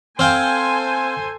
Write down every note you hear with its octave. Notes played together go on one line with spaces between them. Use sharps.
C4 A4 C5 F5 G5 G#5